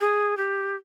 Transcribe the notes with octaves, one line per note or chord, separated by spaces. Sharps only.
G#4
G4